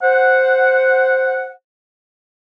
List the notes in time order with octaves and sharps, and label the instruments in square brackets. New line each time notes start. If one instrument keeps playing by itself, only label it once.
[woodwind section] C5 F#5